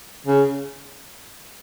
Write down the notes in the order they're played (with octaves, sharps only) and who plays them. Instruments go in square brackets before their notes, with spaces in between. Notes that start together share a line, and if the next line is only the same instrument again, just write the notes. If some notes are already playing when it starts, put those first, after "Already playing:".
[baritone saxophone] C#3